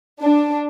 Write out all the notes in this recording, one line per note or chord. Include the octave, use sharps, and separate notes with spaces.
D4